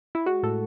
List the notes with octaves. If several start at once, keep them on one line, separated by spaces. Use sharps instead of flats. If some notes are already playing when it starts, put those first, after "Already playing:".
E4
G#3 F#4
A2 A4